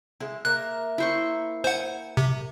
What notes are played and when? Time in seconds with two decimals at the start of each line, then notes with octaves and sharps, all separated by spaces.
0.20 G#3 E4
0.45 A#3 A#4 E5 F#6
0.98 E4 C5 C#6
1.64 C5 F#5 G#5
2.17 C3